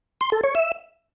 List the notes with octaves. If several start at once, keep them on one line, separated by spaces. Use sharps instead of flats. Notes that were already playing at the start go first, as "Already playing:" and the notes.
C6
A4
C#5
E5